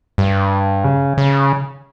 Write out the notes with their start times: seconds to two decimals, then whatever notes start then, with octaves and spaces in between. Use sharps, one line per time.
0.18 G2
0.84 C#3
1.18 C#3